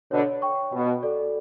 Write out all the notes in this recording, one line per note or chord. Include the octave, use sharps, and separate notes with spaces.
B2 D3 C#5
G5 C#6
B2 F#4
A4 D5